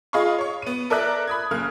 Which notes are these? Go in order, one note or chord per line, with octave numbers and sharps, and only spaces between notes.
F4 G#4 D#5 F5 B5 C#6
C#5 C#6
B3 D#7
A4 A#4 D5 E5 F#6
B5 D#6 G#6
F#1 A#3 F6 G#6